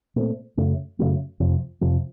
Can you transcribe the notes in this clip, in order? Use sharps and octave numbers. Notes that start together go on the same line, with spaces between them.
A#2 A3 C4
F#2 C#3 F#3 A3
F#2 C#3 F#3 A3
F2 C3 F3
F2 C3 F3